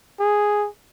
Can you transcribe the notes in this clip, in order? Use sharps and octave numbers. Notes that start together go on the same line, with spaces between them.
G#4